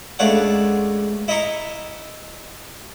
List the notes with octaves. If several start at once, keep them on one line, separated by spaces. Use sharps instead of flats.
C#2 A3 D4 C#5 F5 F#5
E4 D#5 E5 A#5 C#6